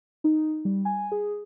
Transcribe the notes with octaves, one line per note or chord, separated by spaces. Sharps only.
D#4
G3
G#5
G#4